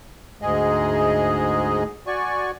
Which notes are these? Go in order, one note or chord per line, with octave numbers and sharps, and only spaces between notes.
D2 G#2 G#3 G#4 D#5
F#4 D5 G#5 C#6